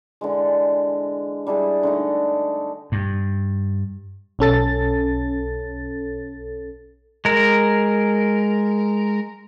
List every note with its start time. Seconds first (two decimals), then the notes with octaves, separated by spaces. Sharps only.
0.21 D3 E3 G#3
1.47 G3 D4 E4 G#4
1.83 D3 A3 D#4
2.92 G2
4.39 B1 C#4 A4 A6
7.25 G#3 A#4